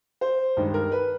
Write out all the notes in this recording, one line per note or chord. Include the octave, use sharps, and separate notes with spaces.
C5
G2 D#3 G#3
A#4
B4